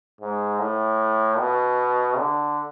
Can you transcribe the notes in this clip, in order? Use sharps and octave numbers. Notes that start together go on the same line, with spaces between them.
G#2
A2
B2
D3